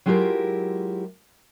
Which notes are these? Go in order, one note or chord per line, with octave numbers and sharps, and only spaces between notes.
F#3 G#3 E4 F4 G4 A#4